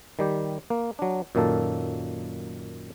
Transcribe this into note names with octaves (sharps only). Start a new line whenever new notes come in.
D#3 G3 G4
A#3
F#3 D4
F#2 A#2 D#3 A#3 A4